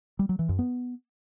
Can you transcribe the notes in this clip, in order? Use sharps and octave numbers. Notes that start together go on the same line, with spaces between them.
G3
F#3
E3
F#2
B3